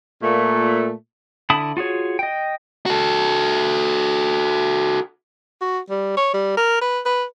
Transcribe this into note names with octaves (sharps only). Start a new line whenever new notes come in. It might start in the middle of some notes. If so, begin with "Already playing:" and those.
A#2 A3
D3 E4 A5 B5 D#6
F4 F#4 G#4 C#5
D#5 G5
F#4 A4
F#4
G3
C#5
G3
A#4
B4
B4